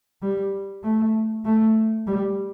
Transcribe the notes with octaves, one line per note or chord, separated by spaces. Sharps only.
G3
A3
A3
G3